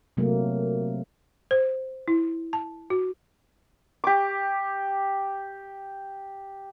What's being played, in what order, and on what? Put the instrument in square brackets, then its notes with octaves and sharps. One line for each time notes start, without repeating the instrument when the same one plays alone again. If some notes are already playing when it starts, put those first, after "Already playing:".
[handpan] C3 F#3 A3 A#3
[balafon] C5
E4
A5
F#4
[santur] G4 D6